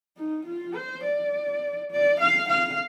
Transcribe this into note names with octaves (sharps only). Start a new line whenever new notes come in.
D#4
F4
C5
D5
D5
F5
F5